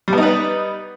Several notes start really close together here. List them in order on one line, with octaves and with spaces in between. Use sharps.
G3 B3 D#4 B4